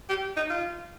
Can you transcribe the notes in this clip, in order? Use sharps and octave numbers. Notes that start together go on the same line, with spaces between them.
G4
D#4
F4